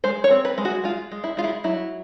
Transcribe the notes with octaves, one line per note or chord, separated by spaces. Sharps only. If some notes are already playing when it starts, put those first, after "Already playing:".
G#3 C5
C#5
C4
B4
G#3
F#4
G#3 F4
G#3
E4
G#3 F4
E4
F#3 E4